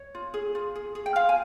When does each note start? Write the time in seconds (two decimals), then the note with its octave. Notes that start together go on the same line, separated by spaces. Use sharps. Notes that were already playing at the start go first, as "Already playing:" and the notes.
Already playing: C#5
0.15 F4
0.34 G#4
0.55 F4
0.75 G#4
0.95 G#4
1.06 G5
1.16 F4 F5
1.29 G#5